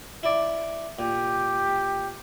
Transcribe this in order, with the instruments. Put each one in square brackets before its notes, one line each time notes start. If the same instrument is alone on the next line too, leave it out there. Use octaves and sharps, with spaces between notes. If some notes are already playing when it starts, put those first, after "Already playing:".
[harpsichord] E4 D5
[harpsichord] A#2 [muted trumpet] G4